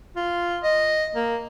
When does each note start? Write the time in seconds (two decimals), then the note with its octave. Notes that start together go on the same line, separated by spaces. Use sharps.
0.16 F4
0.64 D#5
1.15 A#3